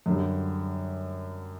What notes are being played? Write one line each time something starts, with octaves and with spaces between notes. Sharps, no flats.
F#2 D3 G3